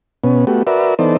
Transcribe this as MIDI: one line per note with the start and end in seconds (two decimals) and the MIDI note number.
0.24 0.45 47
0.24 0.45 59
0.24 0.45 61
0.47 0.63 57
0.47 0.63 59
0.47 0.63 66
0.47 0.63 67
0.67 0.94 66
0.67 0.94 70
0.67 0.94 71
0.67 0.94 74
0.67 0.94 76
0.99 1.17 52
0.99 1.17 59
0.99 1.17 63
0.99 1.17 69
0.99 1.17 72
0.99 1.17 74